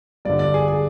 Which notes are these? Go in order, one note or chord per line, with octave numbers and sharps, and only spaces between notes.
G2 D3 D5
D5
G#4
G#4